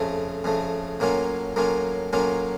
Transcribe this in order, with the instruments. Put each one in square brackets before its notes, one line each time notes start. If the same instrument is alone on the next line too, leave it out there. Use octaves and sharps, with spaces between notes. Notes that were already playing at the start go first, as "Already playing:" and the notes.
Already playing: [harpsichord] F2 C#3 A3
F2 C#3 A3
A2 F#3 A#3 C#4 F4
A2 F#3 A#3 C#4 F4
A2 F#3 A#3 C#4 F4